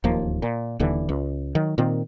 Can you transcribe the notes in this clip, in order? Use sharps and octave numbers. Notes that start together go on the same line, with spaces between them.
D1 D#2 F3 A#3
A#2
D#1 D#2 D3 E3
C#2
D#3 F#3
A#2 D#3 C4